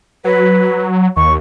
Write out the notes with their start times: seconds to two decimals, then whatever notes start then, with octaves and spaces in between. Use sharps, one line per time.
0.25 F#3 B4
1.17 D#2 C#6